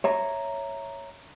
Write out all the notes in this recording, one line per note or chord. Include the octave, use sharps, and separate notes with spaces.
C#5 E5 A#5